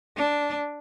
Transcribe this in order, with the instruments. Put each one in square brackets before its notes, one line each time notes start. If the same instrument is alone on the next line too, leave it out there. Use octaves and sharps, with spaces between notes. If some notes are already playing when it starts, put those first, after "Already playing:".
[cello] D4